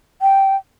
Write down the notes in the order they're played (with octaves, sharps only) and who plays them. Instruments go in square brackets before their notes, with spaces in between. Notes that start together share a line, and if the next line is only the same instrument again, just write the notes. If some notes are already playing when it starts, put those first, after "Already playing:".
[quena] G5